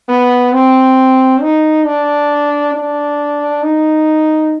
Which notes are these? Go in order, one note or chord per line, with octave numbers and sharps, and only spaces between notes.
B3
C4
D#4
D4
D4
D#4